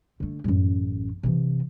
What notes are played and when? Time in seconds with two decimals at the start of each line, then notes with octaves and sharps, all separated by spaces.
0.20 D3 A3
0.44 A1 F#2
1.23 C3 E3